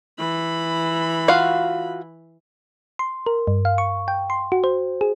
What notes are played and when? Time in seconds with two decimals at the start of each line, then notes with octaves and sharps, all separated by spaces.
0.19 E3 B5
1.28 F4 F#4 F5
2.99 C6
3.26 A#4
3.47 G2
3.65 F5
3.78 C#6
4.08 G5
4.30 C6
4.52 F#4
4.64 C5
5.01 G#4